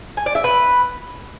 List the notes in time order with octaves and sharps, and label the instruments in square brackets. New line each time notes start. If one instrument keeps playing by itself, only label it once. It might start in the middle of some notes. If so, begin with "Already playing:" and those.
[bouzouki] G#5
D5
E5
B4